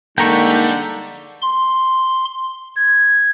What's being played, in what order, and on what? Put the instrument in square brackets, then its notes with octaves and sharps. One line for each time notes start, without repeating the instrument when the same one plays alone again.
[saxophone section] D3 [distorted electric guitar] G3 [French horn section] G#3 A#3 D#4 [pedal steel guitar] G5 A#5 C#6
[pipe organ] C6
G#6